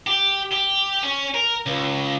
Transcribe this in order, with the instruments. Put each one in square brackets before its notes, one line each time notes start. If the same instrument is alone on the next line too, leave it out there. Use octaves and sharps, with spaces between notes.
[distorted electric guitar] G4
G4
C#4
A#4
C#2